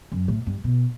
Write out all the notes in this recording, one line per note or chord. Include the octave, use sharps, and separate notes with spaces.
F#2
A2
G2
B2